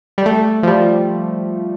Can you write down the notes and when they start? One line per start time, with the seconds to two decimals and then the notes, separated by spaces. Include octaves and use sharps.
0.18 G3
0.26 A3
0.63 F3
0.67 G3